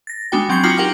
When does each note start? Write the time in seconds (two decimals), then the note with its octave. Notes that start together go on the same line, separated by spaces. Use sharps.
0.07 A6 A#6
0.32 G#3 B3 D4 F#4 G5
0.49 F#3 C4 G5 G#6 C7 C#7
0.63 D#4 F4 F#4 A#5 D6 F#7
0.77 G4 A#4 F#5 G5 F6